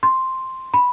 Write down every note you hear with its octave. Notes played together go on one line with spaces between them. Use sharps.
C6
B5